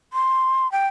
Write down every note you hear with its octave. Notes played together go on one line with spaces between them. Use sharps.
C6
G5